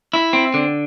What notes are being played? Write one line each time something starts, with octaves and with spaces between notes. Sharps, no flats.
E4
C4
D3